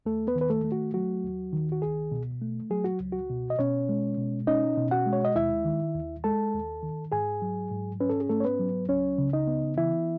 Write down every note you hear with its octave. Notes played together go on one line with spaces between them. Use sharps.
D#2 A3 A4
B3 B4
D#3
B4
A3 A4
A3
F#4
F#3 F#4
D#2
D#3
F#4
C#2 G#4
B2
A3
F#3 G#4
F#4
C#2
F#4
B2
D#5
B2 C#4 C#5
G#3
B2
C#4 D#4 D#5
B2
F#4 F#5
G#3
C#5
D#5
D#2 E4 E5
D#3
D#2
G#3 A4 A5
D#2
D#3
G#2 G#4 G#5
F#3
G#2
C#4 B4
A4
G#4
G#2 A3 A4
C#5
B3 B4
F#3
C#2 C#4 C#5
C#3
D#4 D#5
B3
E3 E4 E5